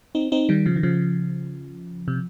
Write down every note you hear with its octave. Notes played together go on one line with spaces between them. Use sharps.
C4 D#4
C4 D#4
D#3 G3
C#3 F3
D#3
C#3 F3
C3